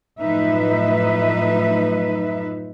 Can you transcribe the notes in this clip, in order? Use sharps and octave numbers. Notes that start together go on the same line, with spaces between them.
F#2 A2 F3 D#4 B4 E5